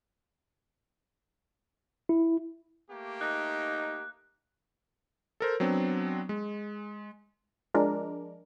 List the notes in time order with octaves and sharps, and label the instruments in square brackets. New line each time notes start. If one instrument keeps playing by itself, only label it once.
[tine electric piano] E4
[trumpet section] A3 A#3 G4
[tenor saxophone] D#4 [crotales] F#6
[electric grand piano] A4 A#4 C5
F#3 B3 C4 D4
G#3
[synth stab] F3 G#3 D4 A#4